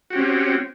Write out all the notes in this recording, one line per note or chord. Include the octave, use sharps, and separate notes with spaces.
C4 C#4 F#4 G4